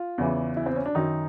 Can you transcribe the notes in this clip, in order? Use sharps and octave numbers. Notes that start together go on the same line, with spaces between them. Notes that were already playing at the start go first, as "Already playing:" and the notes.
Already playing: F4
E2 C#3 E3
E4
C4
C#4
D4
F#2 D#3 D#4